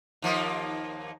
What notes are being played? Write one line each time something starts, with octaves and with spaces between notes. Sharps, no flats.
D#2 F3 A#3